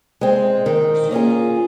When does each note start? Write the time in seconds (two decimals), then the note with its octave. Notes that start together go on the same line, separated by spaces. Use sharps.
0.21 G#3 C4
0.66 D#3
1.11 A#3 C#4 F4 G#4